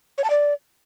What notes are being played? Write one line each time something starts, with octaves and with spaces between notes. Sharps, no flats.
C#5
A5
D5